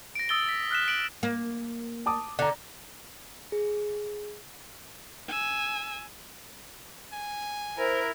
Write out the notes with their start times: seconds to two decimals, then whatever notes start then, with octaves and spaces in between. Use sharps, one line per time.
0.15 A#6 D7
0.29 D#6 E6 A6 G7
0.49 B6
0.71 F6 F#6 B6 E7
0.88 D7 F#7
1.23 A#3
2.06 A5 D6 D#6
2.39 D3 D5 A#5
3.52 G#4
5.28 G#5 E6
7.13 G#5
7.78 E4 A#4 C5